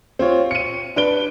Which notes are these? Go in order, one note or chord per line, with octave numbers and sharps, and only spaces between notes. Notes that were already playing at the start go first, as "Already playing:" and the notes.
C4 F4 C#5
C#7 D#7
D4 B4 D7 G7